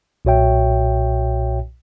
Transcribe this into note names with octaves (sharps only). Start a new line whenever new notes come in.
B1 A#2 F#4 C#5 E5 G5